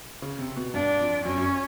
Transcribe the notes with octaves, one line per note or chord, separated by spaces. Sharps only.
C#3
C3
B2
G2 D4
F2
F#2 C#4
F#2